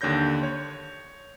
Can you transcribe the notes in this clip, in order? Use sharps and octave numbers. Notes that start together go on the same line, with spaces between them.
D#2 D3 C#5 G6 A#6
C#5